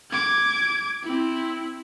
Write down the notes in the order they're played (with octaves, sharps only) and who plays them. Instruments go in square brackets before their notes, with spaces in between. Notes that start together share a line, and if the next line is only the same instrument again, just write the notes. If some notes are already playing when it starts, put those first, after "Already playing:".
[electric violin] D6 G#6
C4 E4